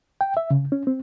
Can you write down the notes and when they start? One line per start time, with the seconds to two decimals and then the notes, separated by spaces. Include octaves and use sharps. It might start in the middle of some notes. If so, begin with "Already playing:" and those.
0.21 G5
0.37 E5
0.51 C#3
0.72 C#4
0.87 C4